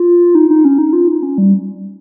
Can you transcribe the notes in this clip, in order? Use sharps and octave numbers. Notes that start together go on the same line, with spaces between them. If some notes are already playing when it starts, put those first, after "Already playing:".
Already playing: F4
D#4
D#4
C#4
D#4
F4
D#4
C#4
G3